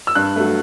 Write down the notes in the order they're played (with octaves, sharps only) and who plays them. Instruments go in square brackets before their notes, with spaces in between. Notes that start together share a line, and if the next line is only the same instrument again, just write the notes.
[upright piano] E6
G2 F#6
F#3 A3